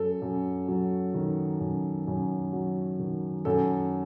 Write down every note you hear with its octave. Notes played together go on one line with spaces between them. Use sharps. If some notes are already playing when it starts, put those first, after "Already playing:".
Already playing: F#2 A4
F#2
F#3
D#3
F#2
F#2
F#3
D#3
F#2 A4